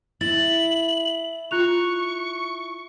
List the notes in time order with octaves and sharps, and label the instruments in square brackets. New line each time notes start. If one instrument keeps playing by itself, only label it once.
[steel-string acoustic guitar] E4 [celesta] A6 [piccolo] F#7
[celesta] F4 F#6 F7 [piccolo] C#6